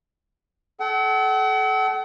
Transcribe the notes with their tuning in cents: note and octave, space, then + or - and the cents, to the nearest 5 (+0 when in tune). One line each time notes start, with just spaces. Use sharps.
A4 -35 F#5 +40